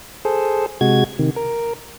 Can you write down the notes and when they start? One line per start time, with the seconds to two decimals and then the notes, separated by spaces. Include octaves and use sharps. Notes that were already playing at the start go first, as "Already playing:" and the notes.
0.25 G#4 A4 C5
0.81 C3 G#3 F#4 G#6
1.19 C3 D#3
1.36 A#4